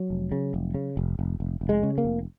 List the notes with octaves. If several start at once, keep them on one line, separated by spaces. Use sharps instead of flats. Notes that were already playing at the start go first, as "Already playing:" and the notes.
Already playing: F#3
F1
C#3
F1
C#3
F1
F1
F1
F1
G#3
C#3
A#3
F1